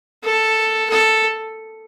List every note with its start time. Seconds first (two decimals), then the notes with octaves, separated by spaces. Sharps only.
0.24 A4
0.90 A4